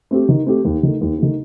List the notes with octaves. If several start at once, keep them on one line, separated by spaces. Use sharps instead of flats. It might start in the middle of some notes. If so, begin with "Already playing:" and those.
A3 C4 G4
D#3
A3 C4 G4
D#2
D#3 A3
D#2
D#3 A3